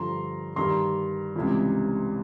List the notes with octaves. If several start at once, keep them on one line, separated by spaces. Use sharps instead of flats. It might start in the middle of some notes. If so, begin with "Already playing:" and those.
Already playing: G2 D3 F3 A#5 C6
G2 D#3 G3 A#5 C6
C#2 C3 E3 G3